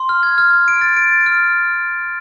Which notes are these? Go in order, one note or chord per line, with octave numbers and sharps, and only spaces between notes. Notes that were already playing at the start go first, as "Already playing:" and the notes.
Already playing: C6
F6
G#6
F6
F6
D7
A6
D7
A6
F6